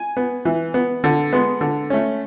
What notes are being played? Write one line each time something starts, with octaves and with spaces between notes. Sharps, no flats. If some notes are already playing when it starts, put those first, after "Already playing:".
Already playing: G#5
B3
E3
B3
D3
G#3 B3
D3
A3 C#4